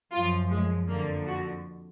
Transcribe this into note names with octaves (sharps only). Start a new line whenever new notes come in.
F#2 F3 F4
G#3
F2 D3 F3 A#3
F#4